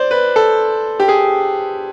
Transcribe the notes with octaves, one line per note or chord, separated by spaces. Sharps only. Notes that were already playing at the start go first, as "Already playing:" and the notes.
Already playing: C5 D5
B4
A4
G4
G#4